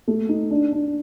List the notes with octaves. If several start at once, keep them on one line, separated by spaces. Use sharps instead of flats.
A3
D#4
D4
D4